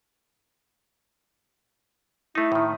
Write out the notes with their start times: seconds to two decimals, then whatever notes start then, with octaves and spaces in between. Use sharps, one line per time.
2.35 A3 D#4 E4
2.52 A2 D#3